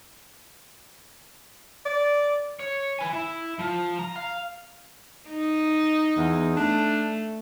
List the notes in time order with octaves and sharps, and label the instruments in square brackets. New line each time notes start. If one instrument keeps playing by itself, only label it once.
[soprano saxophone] D5
[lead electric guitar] C#5
B4 G#5
E4
F3
A#5
F5
[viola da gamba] D#4
[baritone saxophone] E2
[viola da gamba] A3 [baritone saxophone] D4